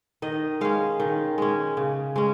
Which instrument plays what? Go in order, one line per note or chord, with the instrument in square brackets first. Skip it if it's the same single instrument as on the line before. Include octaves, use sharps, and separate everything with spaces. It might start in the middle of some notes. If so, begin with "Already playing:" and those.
[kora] D#3 D#5
G#3 C#4 F5
D#3
G#3 C#4
C#3
G#3 C#4